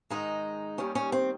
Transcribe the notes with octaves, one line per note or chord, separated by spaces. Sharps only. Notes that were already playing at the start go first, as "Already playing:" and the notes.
G#2 D#3 G#3 D#4
D#2 D#3 G3 C#4
C#4
C4